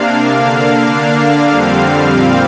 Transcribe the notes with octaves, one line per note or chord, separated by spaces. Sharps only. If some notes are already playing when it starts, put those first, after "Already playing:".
Already playing: C3 A#3 D4 F5
D3 A#3 D4 F5
D3 A#3 D4
F2 D3 G3 C4 F5
A#2 G3 C4